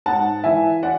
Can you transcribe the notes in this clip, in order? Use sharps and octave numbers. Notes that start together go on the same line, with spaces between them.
G#2 F#5 A5
E3 E5 G#5
D5 F#5